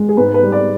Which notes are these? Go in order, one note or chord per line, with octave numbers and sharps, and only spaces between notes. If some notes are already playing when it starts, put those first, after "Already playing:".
Already playing: G#3
G#4
G#2 B4
B4
G3
D5